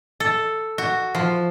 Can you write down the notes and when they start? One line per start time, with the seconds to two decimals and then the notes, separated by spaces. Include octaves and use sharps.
0.20 A4
0.78 F#4
1.15 F3